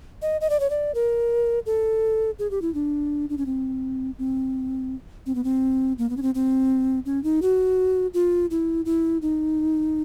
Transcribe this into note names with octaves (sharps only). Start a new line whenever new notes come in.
D#5
D#5
D5
C#5
D5
A#4
A4
G#4
G4
E4
D4
D4
C#4
C4
C4
C4
B3
C4
A#3
B3
C#4
C4
C4
C#4
D#4
F#4
F4
E4
E4
D#4